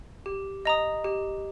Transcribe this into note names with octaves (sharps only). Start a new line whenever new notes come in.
G4
D#5 A#5 D#6
G4